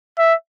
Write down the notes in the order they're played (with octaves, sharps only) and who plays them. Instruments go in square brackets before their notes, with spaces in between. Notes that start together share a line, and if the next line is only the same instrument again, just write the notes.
[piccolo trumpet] E5